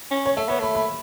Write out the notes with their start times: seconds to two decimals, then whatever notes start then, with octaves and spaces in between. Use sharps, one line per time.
0.11 C#4
0.26 C#5
0.37 A3 E5
0.48 B3 C#5
0.60 A3 B5
0.75 B5